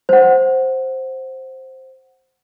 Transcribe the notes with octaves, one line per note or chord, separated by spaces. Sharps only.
C5 F#5